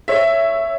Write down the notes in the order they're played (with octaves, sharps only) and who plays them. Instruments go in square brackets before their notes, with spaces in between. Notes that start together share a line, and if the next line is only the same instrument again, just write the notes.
[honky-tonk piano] C#5 E5